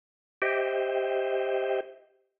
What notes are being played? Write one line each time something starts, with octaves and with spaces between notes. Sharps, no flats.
G4 C5 D#5 E5 G5